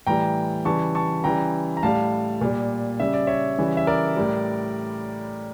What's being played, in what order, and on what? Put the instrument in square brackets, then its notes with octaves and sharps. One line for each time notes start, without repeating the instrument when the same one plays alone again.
[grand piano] A2 E3 G3 G5 A#5
C#3 E3 G3 A5 C#6
A5 C#6
C#3 E3 G3 G5 A#5
A#5
A2 G3 F5 A5
A#2 G3
C#3 G3 E5
D5
C#5 E5
C#3 E3 G3
E5
A#4 D5
A2 G3